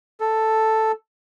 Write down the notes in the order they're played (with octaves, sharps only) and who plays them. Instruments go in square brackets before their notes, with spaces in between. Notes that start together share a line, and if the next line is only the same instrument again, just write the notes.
[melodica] A4